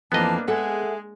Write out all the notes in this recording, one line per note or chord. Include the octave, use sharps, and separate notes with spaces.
F2 E3 A#3 B3 D4 D#5 A5
G#3 G#4 A4 E5 F#5